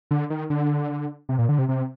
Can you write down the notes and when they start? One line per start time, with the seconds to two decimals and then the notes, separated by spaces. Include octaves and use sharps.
0.11 D3
0.30 D#3
0.50 D3
1.29 C3
1.38 A#2
1.49 D3
1.59 C3
1.69 C3